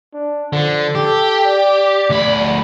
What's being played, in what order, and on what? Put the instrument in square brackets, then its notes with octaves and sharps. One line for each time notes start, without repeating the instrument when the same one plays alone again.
[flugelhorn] D4
[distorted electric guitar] D3 [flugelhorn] F3
[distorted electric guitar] G4 [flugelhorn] A4
[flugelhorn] D5
[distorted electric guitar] D2 B5